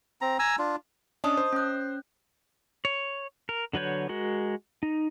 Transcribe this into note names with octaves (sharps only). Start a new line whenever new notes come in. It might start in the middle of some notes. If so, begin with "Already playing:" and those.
C4 A#5
G#5 A#5 E6
D4 F4
C#4 D4 D#5 A5 D#6
C5
C#4 F#6
C#5
A#4
D3 F#3 B4 C#5 G6
G#3 F#4 A#4
D#4